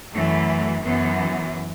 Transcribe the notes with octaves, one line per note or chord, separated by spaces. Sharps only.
F#2 E3 A3
F#2 E3 B3